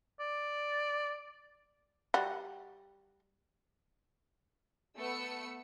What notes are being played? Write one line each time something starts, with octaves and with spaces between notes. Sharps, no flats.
D5
G3 F#4
A3 B3 E6 C#7